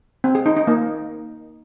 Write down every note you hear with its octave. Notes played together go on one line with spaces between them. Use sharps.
C4
G#4
D#4
D#4
A#3